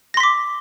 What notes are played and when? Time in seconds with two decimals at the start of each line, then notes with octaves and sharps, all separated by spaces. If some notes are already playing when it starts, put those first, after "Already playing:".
0.14 A#6
0.17 C6
0.20 B6
0.23 D6